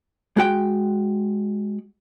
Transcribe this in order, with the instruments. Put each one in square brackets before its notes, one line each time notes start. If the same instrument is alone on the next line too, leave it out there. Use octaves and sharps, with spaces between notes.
[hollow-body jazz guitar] G#3 F#4 G5